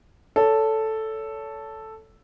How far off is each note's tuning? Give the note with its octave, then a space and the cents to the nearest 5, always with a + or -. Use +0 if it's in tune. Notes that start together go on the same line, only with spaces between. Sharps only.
A4 +0 C#5 +30